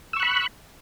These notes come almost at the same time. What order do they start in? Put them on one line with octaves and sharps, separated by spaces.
E6 C#6 F#6 B5